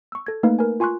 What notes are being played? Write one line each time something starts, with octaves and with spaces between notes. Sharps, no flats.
C#6 E6
A4 G#6
A3 A#3 D#4 B4 F5
A#4 B4 G#5
F4 G#5 C6 C#6 F#6